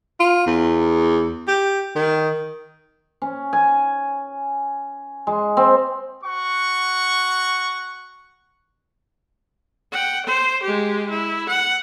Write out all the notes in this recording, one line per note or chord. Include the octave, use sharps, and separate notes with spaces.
F4
E2
G4
D#3
C#4
G#5
G#3
C4
F#4 F#5 C#6
F#5 G5
C5
G#3 G4
E4
F#5